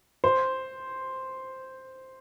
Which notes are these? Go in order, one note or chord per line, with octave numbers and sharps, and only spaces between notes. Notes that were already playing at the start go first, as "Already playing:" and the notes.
C5